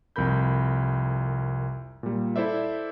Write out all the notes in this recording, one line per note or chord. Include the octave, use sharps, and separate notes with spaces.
C2 F2 A#4 B5 G6
A#2 G3
E4 A4 C5 D5 E5